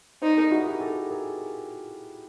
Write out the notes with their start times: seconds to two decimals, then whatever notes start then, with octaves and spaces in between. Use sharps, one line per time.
0.22 D#4 C5 D5
0.36 G#4 A#4
0.51 E4 F#4
0.62 G4
0.66 F#4 G#4
0.81 G4 A4
1.10 G#4 A#4